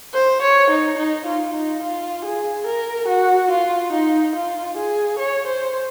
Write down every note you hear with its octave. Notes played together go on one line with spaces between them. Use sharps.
C5
C#5
D#4
D#4
F4
D#4
F4
G#4
A#4
F#4
F4
D#4
F4
G#4
C#5
C5